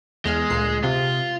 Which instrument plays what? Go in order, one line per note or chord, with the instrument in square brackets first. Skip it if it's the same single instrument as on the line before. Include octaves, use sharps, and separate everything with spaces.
[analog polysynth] E2 F6 [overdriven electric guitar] G#3
[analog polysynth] D2 A#2 C7
[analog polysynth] C3 [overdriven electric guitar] F4